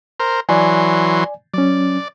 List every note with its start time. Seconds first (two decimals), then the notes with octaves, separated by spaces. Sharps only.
0.20 A#4 C5
0.49 E3 F#3 D5 G#5 C6
1.54 F#3 C#4 D5